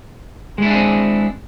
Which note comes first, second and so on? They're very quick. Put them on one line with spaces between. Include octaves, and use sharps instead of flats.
G#3 E4 D4 G#4 C4